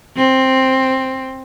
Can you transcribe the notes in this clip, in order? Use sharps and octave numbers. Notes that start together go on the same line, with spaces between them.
C4